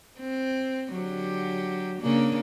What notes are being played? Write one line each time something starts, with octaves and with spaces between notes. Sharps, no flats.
C4
D3 F#3 G4
C#3 A#3 D4